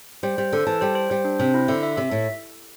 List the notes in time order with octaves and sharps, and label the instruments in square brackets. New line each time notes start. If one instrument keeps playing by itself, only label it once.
[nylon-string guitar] G3 [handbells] C5
[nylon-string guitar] G3 [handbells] C5
[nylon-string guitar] D3 [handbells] A4
[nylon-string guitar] E3 [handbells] A5
[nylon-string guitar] G3 [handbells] C5
[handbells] C5
[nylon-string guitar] G3 [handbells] C5
[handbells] D4
[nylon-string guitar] C3 [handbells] C5
[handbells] E4
[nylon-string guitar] D3 [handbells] E5
[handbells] E5
[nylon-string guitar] C3 [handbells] E5
[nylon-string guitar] A2